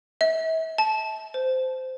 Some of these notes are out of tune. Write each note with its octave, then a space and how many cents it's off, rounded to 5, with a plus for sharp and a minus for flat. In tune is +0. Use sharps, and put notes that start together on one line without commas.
E5 -35
A5 -20
C5 -15